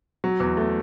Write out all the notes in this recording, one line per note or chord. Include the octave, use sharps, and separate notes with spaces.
F#3
E2
A3